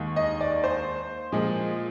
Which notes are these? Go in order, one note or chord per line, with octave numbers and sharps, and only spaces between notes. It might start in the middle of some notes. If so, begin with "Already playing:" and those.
Already playing: D#2 D#3 G#3
D#5
D5
C5
A#2 F3 G#3